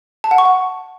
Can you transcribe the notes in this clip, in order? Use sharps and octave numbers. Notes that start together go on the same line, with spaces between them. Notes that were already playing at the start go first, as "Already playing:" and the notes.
A5
F#5
C#6
F#5